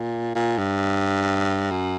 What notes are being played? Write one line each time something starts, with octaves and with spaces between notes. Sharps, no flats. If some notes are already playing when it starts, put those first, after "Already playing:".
Already playing: A#2
A#2
G2
F#2